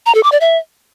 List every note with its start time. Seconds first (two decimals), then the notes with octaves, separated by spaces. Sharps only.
0.06 A#5
0.15 A4
0.23 D6
0.32 D5
0.41 E5